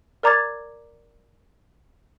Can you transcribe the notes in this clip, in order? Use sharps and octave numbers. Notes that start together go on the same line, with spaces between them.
A#4 D5 A#5 D6 G#6 A6